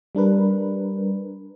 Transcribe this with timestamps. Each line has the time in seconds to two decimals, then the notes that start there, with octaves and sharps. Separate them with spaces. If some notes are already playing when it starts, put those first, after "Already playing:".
0.15 G3 D4 A#4 B4